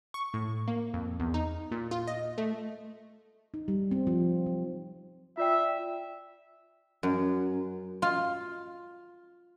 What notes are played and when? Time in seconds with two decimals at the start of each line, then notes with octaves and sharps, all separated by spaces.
0.14 C#6
0.34 A2
0.68 A#3
0.94 F2
1.20 E2
1.34 D#4
1.71 A#2
1.91 F4
2.08 D#5
2.38 A3
3.54 D#4
3.68 G3
3.91 C4
4.07 F3
4.46 F#3
5.37 F4 D5 E5 G5
7.03 F#2
8.02 F4